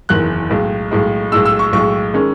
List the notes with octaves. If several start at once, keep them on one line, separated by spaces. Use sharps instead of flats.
F#1 E2 D#3 F#6
B1 A2 G#3
B1 A2 G#3
B1 A2 G#3 E6
E6
C#6
B1 A2 G#3 C#6
D#3 G#3 C#4